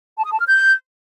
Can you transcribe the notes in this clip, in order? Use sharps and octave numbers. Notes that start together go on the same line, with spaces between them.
A5
D#6
A5
F6
G6